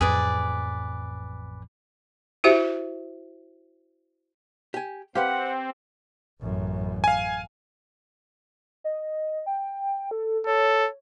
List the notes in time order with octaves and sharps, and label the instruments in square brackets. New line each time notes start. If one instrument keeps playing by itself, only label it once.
[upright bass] A1 F2 [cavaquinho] G#4 B4 D5
[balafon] E4 F#4 G4 C5 E5
[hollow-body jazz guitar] G4 G#5
[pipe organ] C4 [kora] G4 [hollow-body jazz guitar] B4 C5 F5 [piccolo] F#5
[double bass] A1 F#2
[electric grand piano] F5 G#5
[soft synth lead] D#5
G5
A4
[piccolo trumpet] A4 [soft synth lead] C#5